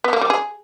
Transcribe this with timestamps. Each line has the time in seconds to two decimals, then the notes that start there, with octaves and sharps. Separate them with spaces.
0.04 B3
0.13 A#3
0.21 G3
0.30 G#4